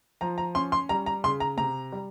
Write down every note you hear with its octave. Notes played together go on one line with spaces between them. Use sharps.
F3 A#5
A#5
C#4 C6
C6
G3 A#5
A#5
C#3 C6
A#5
C3 A#5
G3